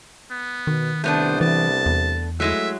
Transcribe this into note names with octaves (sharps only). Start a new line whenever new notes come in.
B3
B2 D#3
C2 A3 B3 D4 C5
E3 A5
E2
F#3 G#3 A3 E4 E5